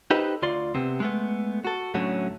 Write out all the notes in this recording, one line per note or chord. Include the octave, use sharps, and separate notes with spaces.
D#4 G4 A4 B4 C5 D#5
D2 F4 D5 C6
C3 B3 C4
G#3 A3 B3
F#4 A4
D2 A2 D3 F#3 A3 C#4